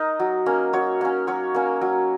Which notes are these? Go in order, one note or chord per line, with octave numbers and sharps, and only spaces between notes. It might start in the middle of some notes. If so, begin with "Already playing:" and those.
Already playing: D#4 A#4 D#5
F#3
A#3 C#4
F#3 C#5
A#3 C#4
F#3 C#5
A#3 C#4
F#3